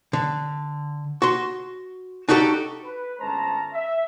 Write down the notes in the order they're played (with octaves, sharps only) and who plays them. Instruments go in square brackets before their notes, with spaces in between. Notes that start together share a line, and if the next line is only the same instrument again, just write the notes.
[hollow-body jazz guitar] D3
F#4 C6
D4 D#4 F#4 G4 A4
[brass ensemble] B4
G1 G#3 C#4 C5 A5 A#5
E5